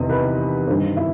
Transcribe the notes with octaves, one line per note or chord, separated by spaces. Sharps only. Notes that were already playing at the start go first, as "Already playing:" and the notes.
Already playing: E2 C3 D#3 D#5
B4
G2 D#3 C5
E4 E5